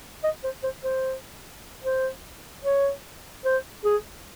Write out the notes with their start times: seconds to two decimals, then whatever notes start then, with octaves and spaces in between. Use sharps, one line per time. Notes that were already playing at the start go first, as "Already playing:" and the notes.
0.24 D#5
0.44 C5
0.63 C5
0.84 C5
1.84 C5
2.65 C#5
3.45 C5
3.85 G#4